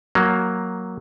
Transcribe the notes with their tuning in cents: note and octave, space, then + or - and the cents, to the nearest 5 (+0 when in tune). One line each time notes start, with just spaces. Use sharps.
F#3 +0 A#3 +0